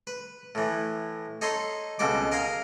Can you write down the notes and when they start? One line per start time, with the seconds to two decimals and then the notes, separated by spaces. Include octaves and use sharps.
0.07 B4
0.55 A2 E3
1.41 D#4 A4 C#5 D#5 C6
1.99 C#2 B2 C4 A4 D6
2.32 A#4 D#5 F5 G#5 A#5